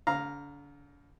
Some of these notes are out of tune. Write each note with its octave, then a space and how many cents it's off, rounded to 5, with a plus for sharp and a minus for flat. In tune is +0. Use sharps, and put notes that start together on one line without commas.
D3 -40 F5 +0 A#5 +0